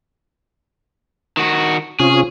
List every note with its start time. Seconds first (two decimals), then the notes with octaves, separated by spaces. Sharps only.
1.37 D#3 F#4
2.00 C3 C#4 F4 G#4